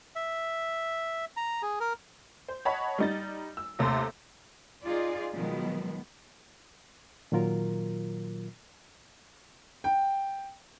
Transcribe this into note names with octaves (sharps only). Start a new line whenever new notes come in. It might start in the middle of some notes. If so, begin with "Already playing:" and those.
E5
A#5
G#4
A#4
C5
C#5 D#5 F#5 A5 B5 B6
G3 D#4 A6
E6
D#2 C3 A3 A4 C6
D#4 F4 G#4 D5
B2 D#3 F3 F#3 G#3 B3
A#2 D#3 F#3 F4 A#4
G5